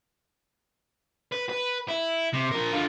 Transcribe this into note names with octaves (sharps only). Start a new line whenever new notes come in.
B4
B4
E4
C3
F3 A#4
D3 F4